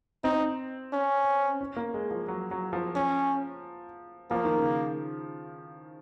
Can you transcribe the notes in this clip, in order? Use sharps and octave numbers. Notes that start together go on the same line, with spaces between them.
C4 D#4
C#4
C#4
A#3
G#3
F3
F#3
F#3
F3
C#4
F3 A#3
D#3
C#3